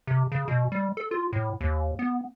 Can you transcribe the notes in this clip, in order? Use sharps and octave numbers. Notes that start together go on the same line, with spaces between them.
C3
C#3
B2
G3
A4
F4
A2
D#2
B3